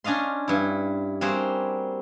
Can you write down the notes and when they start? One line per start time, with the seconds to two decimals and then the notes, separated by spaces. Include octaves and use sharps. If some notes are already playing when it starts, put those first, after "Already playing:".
0.04 C#4 D4 D#5 F5 C6
0.48 G2 E4
1.21 G3 A#3 C4 F#4 G#4 C5